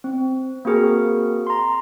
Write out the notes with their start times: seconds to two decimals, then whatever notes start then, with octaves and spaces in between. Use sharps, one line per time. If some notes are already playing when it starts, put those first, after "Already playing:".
0.04 C4
0.65 A#3 C4 F#4 G#4 A#4
1.47 A#5 C6